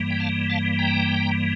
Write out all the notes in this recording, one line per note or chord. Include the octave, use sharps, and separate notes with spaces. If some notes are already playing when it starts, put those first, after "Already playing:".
Already playing: G2 E3 G3 A#3
G5
F5 A5
F5 A5
G5 A#5